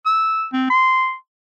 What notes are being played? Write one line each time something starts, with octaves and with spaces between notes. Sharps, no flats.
E6
C4
C6